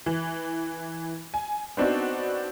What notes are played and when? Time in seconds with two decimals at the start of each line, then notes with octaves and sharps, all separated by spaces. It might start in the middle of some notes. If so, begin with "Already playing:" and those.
0.06 E3
1.34 G#5
1.77 B3 C4 D4 D#4 F#4